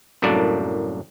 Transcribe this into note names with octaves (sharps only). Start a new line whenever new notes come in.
C2 F#2 A2 A#3 D4 A5